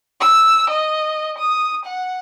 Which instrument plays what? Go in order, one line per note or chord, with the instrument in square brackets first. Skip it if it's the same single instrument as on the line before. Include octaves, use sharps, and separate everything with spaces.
[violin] E6
D#5
D#6
F#5